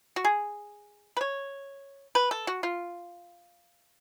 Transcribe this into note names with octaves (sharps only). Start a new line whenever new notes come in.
F#4
G#4
B4
C#5
B4
A4
F#4
F4